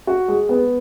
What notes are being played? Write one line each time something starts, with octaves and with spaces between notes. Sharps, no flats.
F#4
G#3
B3